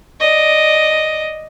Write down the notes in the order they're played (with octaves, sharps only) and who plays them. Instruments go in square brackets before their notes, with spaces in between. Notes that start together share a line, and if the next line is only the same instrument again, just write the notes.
[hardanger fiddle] D5 D#5